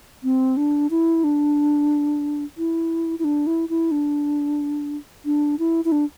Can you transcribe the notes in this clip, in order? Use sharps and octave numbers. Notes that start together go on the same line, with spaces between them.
C4
D4
E4
D4
E4
E4
D4
E4
E4
D4
D4
E4
E4
D4